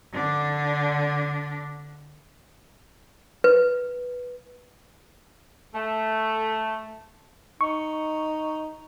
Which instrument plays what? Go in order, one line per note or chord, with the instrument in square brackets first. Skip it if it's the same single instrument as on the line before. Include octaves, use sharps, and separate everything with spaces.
[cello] D3 D4
[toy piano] B4
[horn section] A3
[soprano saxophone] D#4 [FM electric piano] C#6